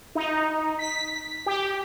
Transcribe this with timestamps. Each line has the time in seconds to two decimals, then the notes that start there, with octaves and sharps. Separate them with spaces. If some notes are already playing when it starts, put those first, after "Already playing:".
0.15 D#4
0.79 B6
1.46 G4